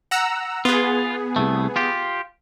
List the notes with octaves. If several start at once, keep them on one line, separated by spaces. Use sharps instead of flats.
F#5 A#5 E6
B3 F4 G#4
C2 A3
F4 G4